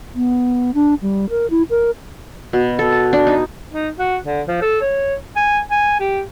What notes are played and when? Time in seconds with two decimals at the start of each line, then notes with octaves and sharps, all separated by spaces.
0.15 B3
0.74 D4
1.02 G3
1.30 A#4
1.50 E4
1.70 A#4
2.53 B2
2.79 A4
2.92 A5
3.13 D4
3.27 D#4
3.72 D#4
3.99 F#4
4.24 D3
4.48 F3
4.62 A4
4.81 C#5
5.36 G#5
5.70 G#5
6.00 G4